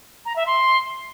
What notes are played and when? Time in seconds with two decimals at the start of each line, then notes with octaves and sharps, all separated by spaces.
0.25 A#5
0.35 E5
0.46 C6